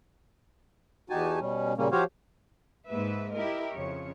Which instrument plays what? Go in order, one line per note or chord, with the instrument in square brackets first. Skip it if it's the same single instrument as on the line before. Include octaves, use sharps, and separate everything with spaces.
[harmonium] E2 D#4 F#4 G4 G#5 A5
B2 G3 C#4
A#2 C#3 G3 A#3 C#4
F3 F#4 G4 C5 C#5 F5
[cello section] G#2 A#3 B4 E5
E4 G4 A#4 D#5
F2 C#3 C#5